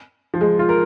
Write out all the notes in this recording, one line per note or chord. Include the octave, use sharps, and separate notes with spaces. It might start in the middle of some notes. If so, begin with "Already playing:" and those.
F3
G#3
F4
A#4